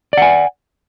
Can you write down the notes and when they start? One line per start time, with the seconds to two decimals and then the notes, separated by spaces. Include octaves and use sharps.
0.13 D5
0.18 F#5
0.22 G#5